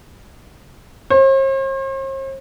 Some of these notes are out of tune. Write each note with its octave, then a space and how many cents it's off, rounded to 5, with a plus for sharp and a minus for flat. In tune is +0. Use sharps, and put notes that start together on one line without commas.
C5 +45